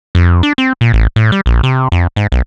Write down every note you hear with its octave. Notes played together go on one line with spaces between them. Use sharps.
F2
D4
C4
A#2
A1
A2
G3
A#1
C3
F2
G#2
B1